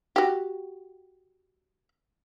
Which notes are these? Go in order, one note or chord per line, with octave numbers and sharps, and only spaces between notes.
F#4 G4